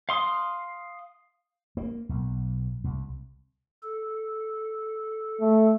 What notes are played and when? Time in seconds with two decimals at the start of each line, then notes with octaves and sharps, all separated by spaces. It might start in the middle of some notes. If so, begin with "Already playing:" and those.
0.09 F5 C6 D#6
1.77 A#3
2.09 B1
2.84 C2
3.83 A4
5.41 A3